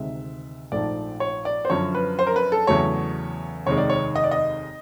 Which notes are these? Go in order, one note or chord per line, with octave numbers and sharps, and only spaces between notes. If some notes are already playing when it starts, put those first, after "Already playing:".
Already playing: D2 C3 D#3 G#3 E5
A#1 G#2 F3 A3 D5
C#5
D5
C5
F#2 D3 F3 C#5
B4
C5
A#4
B4
A4
E2 C#3 F#3 A3 C#5
F1 D#2 D#3 G#3 C#5
D5
C#5
D#5
D5
D#5